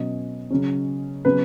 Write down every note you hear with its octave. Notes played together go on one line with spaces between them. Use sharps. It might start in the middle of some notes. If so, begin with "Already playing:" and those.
Already playing: B2 F#3 C#4 D#5
C#3 F#3 C#4
C#3 F#3 B3 B4